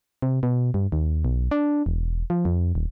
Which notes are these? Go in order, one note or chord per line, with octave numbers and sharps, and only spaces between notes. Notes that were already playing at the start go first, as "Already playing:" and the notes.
C3
B2
G2
D#2
B1
D4
E1
F3
F2
D#1